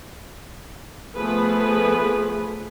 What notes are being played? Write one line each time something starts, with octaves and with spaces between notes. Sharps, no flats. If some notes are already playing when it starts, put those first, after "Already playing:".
F3 A3 B3 G#4 B4